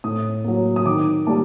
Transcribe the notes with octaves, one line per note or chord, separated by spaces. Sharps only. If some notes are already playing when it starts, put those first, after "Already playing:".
A2 D#6
F#3 A#3
D#6
D#3 D6
G3 A#3 A5